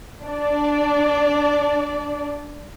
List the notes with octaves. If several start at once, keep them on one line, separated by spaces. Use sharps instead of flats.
D4 D5